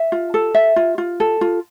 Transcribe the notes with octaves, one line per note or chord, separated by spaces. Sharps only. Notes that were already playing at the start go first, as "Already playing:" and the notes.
Already playing: E5
F4
A4
E5
F4
F4
A4
F4